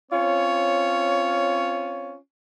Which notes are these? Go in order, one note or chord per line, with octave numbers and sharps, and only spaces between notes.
C4 C#4 F4 C#5